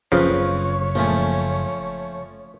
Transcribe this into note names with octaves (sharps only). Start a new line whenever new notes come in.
F#1 C#3 F3 C4 B4 C#5 F5
A#1 F3 A3 C#4